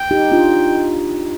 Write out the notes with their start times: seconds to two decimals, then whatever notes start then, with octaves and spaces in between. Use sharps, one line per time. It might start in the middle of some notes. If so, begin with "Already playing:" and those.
Already playing: G5
0.11 D#4 G4
0.32 D4 F4